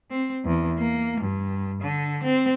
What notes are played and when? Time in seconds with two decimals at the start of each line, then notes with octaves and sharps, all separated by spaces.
0.11 C4
0.45 E2
0.78 A#3
1.21 G2
1.81 D3
2.23 C4